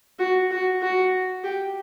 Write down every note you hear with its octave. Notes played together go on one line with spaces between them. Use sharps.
F#4
F#4
F#4
G4